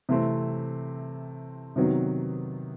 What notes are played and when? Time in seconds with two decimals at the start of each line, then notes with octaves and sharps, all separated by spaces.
0.09 C3 E3 A3 C4
1.76 C3 D#3 F#3 B3